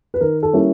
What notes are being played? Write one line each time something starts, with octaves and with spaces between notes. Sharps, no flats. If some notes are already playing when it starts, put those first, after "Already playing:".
B4
D#3 A#4
A4
G3 A#3 C#4 E4